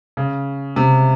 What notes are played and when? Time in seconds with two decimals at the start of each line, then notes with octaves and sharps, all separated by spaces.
0.17 C#3
0.76 C3